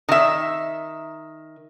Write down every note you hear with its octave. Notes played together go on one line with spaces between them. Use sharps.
D#3 E5